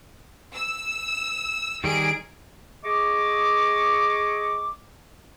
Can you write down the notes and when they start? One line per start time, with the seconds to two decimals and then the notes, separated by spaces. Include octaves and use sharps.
0.54 E6
1.84 D#3 G3 D#4 G#4 D7
2.85 G#4 D#5 C#6 D6